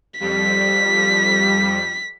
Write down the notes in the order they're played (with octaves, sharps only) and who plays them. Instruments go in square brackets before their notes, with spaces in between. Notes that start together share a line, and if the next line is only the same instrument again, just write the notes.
[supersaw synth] F2 G3 [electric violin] B6